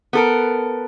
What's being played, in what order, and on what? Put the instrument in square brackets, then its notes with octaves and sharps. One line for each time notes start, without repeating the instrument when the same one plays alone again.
[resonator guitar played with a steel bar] B3 A4 A#4